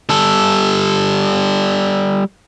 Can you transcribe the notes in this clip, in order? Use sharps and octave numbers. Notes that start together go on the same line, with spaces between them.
G3 A4